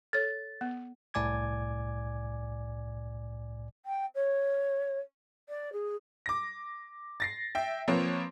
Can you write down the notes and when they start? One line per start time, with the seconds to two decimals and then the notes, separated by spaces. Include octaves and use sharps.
0.13 A4 C#5 A6
0.61 B3
1.14 C2 A2 D5 G#5 D6 G#6
3.85 G5
4.15 C#5
5.49 D5
5.72 G#4
6.26 D6 A#6
7.20 A6 A#6 C7
7.55 E5 G5
7.88 F3 A#3 C4 B4 C#5